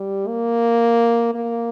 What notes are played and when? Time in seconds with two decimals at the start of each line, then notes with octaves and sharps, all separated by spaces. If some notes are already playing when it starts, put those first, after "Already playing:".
Already playing: G3
0.27 A#3
1.34 A#3